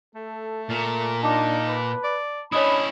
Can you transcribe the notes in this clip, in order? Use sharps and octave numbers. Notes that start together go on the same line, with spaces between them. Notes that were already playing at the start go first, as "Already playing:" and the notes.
A3 A4
A#2 A#4
D4 D#4 A5 D6
B4
D5
C#4 D4 E4 C#5 D#5 B5 D#6